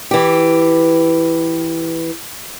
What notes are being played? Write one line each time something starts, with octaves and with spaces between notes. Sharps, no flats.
E3 G4